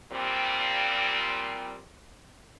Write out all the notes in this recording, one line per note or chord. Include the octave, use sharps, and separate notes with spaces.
A#2 G3 C4